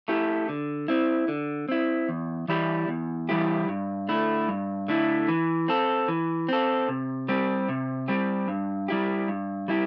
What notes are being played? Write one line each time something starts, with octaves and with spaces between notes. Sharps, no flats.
A3 E4 G4
D3
C4 E4
D3
C4 E4
E2
E3 G3 E4 G4
E2
E3 G3 E4 G4
G2
D3 A3 E4
G2
D3 A3 E4
E3
C4 A4
E3
C4 A4
C3
G3 C4 G4
C3
G3 C4 G4
G2
G3 E4 G4
G2
G3 E4 G4